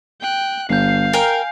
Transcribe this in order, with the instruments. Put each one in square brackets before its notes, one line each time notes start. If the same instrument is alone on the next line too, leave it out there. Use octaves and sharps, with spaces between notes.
[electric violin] G5 F#6
[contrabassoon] G1 [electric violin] F5 [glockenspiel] G6 C7
[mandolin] A#4 G5 [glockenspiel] G#5